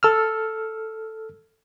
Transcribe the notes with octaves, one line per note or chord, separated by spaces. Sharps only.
A4 E6 F6